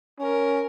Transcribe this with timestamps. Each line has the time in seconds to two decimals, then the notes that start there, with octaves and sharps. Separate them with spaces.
0.20 C#4 A#4